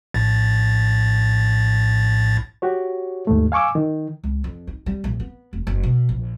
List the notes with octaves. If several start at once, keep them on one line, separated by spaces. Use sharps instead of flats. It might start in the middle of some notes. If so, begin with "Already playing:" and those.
A#1 A2 A6
F#4 G4 C#5
D#2 G#2 A3
F5 G#5 C#6 D6 E6
D#3
C#2
F2
D#4
G3
A#1
B3
F1
F#1
B2
A#1